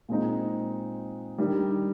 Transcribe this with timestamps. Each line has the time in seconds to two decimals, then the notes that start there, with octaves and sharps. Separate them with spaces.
0.09 A#2 G#3 C4 D#4
1.38 D#3 G3 D4